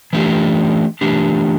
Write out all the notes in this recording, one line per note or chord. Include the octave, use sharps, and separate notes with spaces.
E3 A3 D4 G4
E3 A3 D4 G4